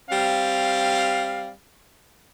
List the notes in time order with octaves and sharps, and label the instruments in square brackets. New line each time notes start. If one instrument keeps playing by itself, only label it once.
[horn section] G3 C4 F5